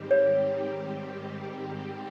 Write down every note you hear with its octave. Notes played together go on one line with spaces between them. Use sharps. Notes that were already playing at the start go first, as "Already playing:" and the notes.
Already playing: G#2 D#3 G3 C4 G4
C#5